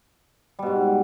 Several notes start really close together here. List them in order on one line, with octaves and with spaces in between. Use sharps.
G3 B2 G#2